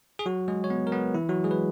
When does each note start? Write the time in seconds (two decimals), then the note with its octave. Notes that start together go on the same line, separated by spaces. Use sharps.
0.19 G#4
0.26 F#3 F#4
0.48 G#3 G#4
0.64 C#5
0.70 B3 B4
0.87 A#4
0.92 B3 B4
1.14 E3 E4
1.29 F#3 F#4
1.44 G#3 G#4
1.51 B4